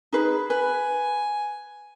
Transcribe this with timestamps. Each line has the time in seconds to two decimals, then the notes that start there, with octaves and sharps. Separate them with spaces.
0.12 D#4 G#4 B4
0.50 B4 G#5